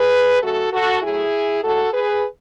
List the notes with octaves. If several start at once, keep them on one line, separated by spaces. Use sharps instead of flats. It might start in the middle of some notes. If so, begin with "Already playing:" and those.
Already playing: G#4 B4
C#3 F#3 A3 F#4 A4
F#4 A4
A2 F#3 A3 E4 G#4
A2 G#3 F#4 A4
G#4 B4